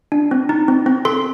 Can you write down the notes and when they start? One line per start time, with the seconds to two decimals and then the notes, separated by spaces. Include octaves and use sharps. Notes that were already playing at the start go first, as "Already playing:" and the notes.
0.12 D4
0.31 C4
0.49 D#4
0.68 C4
0.86 C4
1.05 A4 C6